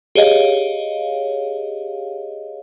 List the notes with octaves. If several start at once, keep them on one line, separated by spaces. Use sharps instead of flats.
G4 G#4 C#5 D#5 F5